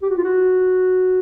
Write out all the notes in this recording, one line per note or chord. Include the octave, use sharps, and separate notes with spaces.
G4
F#4
F4
F#4